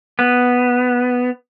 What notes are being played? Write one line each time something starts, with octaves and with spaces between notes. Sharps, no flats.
B3